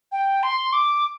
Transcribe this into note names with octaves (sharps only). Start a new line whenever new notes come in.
G5
C6
D6